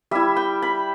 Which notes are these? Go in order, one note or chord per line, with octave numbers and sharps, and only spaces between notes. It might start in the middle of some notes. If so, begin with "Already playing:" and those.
G3 E4 E5
G5
B5